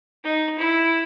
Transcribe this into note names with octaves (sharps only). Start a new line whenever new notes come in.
D#4
E4